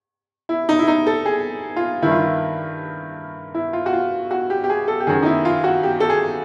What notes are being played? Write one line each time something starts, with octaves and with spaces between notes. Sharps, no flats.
E4
D#4
E4
D#4
A4
G#4
F4
G2 D#3 E4
F4
E4
E4
F4
F#4
F4
F#4
G4
G4
G#4
A4
G4
F#2 D#3 G#4
D#4
E4
F4
F#4
G4
A4
G#4